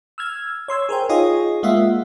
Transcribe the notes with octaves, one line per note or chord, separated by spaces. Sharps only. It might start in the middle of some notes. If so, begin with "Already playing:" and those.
E6 F6 G#6
C#5 C6 E6 G#6
G#4 A#4 C5 G5
D#4 F4 G#4 C#5 D#5
G#3 A#3 F4 D#5 E5 F#5